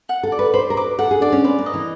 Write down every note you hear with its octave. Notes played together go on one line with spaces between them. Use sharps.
F#5
A4
D5
B4
C5 B5
A#4
B4 D6
A4 F#5
G#4
D4 D5
C#4
C4 B4
A#3
D#5
E3